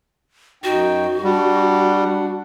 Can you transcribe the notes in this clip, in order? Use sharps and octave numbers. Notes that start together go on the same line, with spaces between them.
F#2 D#4 F#4 G5
G3 D4 F#5